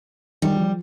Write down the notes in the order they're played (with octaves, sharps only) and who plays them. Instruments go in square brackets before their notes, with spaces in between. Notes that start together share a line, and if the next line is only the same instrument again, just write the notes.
[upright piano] D#3 [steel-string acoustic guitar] G3
[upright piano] F3